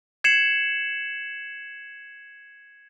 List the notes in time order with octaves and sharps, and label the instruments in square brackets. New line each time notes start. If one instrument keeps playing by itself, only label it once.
[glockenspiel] G#6 C7 C#7 E7 F#7